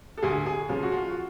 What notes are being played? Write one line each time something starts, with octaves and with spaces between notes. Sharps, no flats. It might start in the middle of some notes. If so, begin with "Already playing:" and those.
A4
D2 G#4
G#4
C#3 F3 F4
F#4
F4
F#4